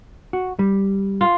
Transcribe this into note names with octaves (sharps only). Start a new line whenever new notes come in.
F#4
G3
F4